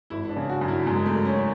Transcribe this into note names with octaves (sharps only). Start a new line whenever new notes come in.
G#1 E4
D4
C#3
F#4
F#2
E4
F#2 G#3
A3
G#1
C#4